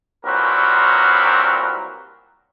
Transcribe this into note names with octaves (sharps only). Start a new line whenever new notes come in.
C2 A#2 F#3 C4 A#4 B4